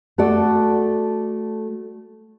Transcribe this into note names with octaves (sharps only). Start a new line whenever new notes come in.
A3 F#4 A4 D5